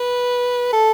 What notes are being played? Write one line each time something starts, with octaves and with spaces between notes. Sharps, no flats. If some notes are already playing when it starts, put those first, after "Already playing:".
Already playing: B4
A4